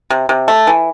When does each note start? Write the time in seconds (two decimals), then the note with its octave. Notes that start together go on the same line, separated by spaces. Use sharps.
0.10 C3
0.29 C3
0.48 A3
0.67 E3